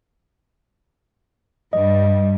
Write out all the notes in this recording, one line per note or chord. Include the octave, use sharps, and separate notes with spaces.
G2 G3 D#5